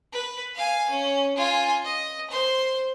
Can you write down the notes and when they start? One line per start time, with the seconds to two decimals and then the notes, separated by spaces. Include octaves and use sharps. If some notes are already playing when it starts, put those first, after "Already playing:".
0.13 B4
0.55 F5 G#5
0.91 C#4
1.36 F4 G#5
1.84 D#5
2.30 C5 C6